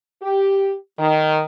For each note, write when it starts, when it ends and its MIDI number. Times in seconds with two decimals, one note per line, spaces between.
0.23 0.75 67
0.99 1.44 51